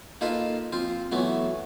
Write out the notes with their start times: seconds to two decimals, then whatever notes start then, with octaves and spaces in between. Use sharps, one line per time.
0.21 A#3 D#4 F4 A4 B4
0.72 F3 C4 F4
1.12 E3 F#3 A3 B3